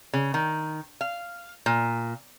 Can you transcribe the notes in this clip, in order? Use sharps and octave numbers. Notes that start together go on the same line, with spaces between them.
C#3
D#3
F5
A#2